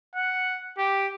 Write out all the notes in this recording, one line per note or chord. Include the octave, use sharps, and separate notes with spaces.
F#5
G4